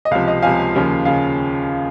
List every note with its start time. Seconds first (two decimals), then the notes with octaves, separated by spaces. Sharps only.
0.05 D#5
0.11 C#2 C3 F3 F5
0.27 D#5
0.42 C#2 C3 F3 F5 G#5
0.75 D#2 C#3 F3
1.05 C#3 F5